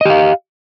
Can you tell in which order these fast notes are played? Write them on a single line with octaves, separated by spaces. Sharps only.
D#5 G4 F5